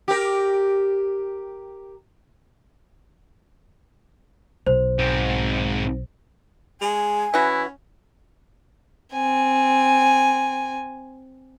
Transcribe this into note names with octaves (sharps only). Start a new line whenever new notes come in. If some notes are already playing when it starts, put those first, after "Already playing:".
G4 A#4
B1 C5
G#2 C4
G#3 G#5
E3 C#4 E4 F#4
C4 G#5